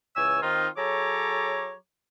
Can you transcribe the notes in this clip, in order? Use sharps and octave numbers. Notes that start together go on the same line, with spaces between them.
C#2 E3 C#5 G#5 E6
D#3 C4 D#4 F4
F#3 G#4 A4 C#5 A#5 D6